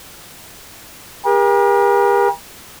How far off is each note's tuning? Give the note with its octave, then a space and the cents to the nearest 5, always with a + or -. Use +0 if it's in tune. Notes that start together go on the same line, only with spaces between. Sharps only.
G4 +45 A#4 +40